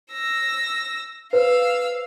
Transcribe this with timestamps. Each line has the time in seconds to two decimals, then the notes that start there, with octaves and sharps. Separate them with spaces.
0.11 E6 A#6
1.33 B4 C5 F5 E6